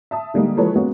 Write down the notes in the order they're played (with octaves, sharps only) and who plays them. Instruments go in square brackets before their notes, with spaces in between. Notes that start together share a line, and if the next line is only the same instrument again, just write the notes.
[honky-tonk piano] E5 A5 D#6
D3 G3 G#3 A#3 D#4
E3 F3 G#3 A4 B4 C#5
G#3 A#3 B3 C#4 F#4